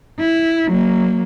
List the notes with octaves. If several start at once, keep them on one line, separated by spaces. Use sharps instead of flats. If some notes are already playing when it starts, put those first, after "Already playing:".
E4
F#3 A#3